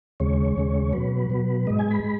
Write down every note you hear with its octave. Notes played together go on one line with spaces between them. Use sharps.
D#2 C#3 G#3 C#5
D#2 C#3 G#3
B2 F#3 B4
B2 F#3
G#2 G#3 D#5
G#5
B5
G#3